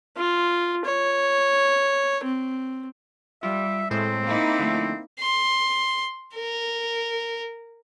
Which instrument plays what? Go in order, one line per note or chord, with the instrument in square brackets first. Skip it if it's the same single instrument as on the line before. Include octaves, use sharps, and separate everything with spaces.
[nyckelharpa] F4
C#5
C4
[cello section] G3 [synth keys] F4 [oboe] E5
[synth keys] A2 G#3 C5 [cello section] A3 [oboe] C4
[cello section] A#3 D#4 E4
[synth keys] D3 F3 A3
[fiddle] C6
A#4